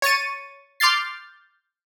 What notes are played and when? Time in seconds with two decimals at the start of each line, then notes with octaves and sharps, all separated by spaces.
0.02 C#5 C#6 A6 D#7
0.80 C6 D6 F6 G6 A6 C7